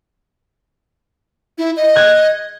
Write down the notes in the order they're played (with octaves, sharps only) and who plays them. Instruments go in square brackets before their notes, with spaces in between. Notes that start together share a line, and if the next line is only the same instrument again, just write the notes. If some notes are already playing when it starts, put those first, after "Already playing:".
[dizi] E4
D#5
[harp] F#6 G#6